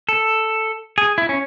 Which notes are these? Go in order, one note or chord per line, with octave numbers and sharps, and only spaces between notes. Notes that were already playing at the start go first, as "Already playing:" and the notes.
A4
G#4
E4
C#4